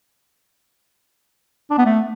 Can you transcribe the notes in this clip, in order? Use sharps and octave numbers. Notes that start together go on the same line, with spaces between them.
D4
B3
A3